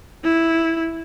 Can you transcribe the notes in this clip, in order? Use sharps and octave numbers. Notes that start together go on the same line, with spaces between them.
E4